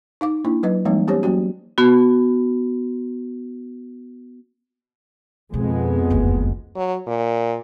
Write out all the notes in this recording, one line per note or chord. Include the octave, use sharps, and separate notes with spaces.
D#4 F5 D6
A#3 D4 E4
F#3 B4 D#5
E3 G3 G#3 A#3 C4 D#4
B3 C#4 G4 C5 C#5
F#3 A#3 C#4 F#4
B3 F#4
F2 B2 G#3 B3
F#1 D2
F#3
A#2